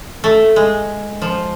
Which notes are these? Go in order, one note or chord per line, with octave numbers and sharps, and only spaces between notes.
A3
G#3
F3